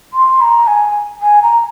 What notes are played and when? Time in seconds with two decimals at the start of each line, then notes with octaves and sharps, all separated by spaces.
0.13 C6
0.41 A#5
0.67 G#5
1.22 G#5
1.43 A#5